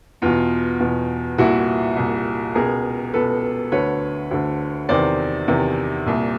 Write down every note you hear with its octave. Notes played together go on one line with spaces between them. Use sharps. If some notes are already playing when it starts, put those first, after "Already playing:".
E2 B2 F4
E2 B2
C2 A#2 E4 F#4
C2 A#2
C#2 B2 G#4 A#4
C#2 B2 A4 B4
D2 D3 B4 C#5
D2 D3
E2 C3 D#3 C5 D5
E2 C3 D#3
C2 A#2